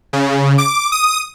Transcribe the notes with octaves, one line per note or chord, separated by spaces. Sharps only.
C#3
D6
D#6